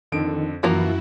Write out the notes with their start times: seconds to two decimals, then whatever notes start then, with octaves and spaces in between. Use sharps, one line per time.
0.12 F2 D3 D#3 D7
0.63 F#2 E3 F3 A#3 E4 F#4 A#5